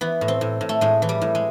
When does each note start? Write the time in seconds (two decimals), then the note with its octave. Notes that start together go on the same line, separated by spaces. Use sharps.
0.01 E3 B3
0.21 A2
0.28 C4
0.41 A2
0.61 A2
0.69 A3
0.81 A2 G#3
1.02 E3
1.09 G3
1.21 A2
1.35 G#3